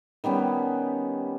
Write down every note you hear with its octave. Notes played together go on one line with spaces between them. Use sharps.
D#3 G3 B3 C#4